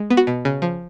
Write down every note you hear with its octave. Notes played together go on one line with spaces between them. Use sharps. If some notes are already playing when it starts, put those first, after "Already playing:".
Already playing: G#3
B3
F#4
B2
C#3
F3